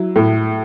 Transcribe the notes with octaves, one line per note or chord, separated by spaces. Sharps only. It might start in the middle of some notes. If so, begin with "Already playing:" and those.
Already playing: F#3 E4
A2